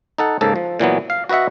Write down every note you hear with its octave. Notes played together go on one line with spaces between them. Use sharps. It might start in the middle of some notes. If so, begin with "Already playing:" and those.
D#4 A4 F#5
G#2 C#3 A#3 A4
F3
A#2 E3 F#3 B3
F5
F#4 B4 D#5 E5 F#5